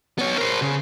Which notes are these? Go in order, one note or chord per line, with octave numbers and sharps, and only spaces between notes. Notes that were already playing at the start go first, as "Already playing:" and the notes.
B3 C#5
A#4 C5
C#3